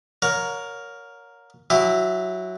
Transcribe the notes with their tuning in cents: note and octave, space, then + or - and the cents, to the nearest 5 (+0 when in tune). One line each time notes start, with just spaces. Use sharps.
A#4 +0 C#5 +20 F#5 -45
F#3 +0 E4 +0 G4 +45